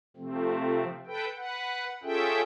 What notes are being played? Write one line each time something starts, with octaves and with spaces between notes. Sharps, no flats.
C3 F3 A3 C4
A4 B4 G5
B4 F#5
C#4 F4 G#4 A4 E5 G5